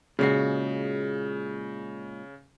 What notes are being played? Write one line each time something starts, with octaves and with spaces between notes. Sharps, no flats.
A#2 C#3 G#3 F#4 C7